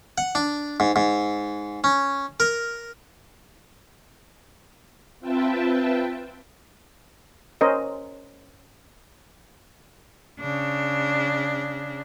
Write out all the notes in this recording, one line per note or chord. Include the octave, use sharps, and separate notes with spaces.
F#5
D4
G#2
G#2
C#4
A#4
C4 F4 B4 E5 G5 A5
C#4 A#4 C5 D#5
C#3 D4